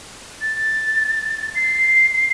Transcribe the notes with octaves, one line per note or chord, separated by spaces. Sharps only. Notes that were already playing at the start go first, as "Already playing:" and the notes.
A6
C7